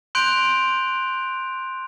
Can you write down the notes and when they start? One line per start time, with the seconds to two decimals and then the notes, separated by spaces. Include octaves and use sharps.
0.15 C6 F#6 G6 D7 F7